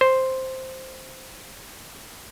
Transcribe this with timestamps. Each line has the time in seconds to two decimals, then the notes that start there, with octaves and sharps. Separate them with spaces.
0.01 C5